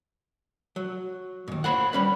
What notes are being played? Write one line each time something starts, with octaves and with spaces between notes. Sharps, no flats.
F#3
D#2 G#2
C5 C#5 F#5 B5
G3 C#4 B4